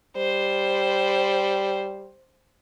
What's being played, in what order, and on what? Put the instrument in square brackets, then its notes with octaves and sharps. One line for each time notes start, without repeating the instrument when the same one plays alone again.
[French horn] G3 [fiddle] C5